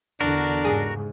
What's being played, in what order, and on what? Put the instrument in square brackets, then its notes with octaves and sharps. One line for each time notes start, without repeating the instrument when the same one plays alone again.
[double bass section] E2 D3 [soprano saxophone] D4 [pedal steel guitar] F#4 A#4
[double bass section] G#2 C#3 [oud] G#4